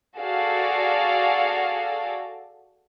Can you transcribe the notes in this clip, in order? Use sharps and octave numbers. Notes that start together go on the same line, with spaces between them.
F#4 G#4 A4 D5 F5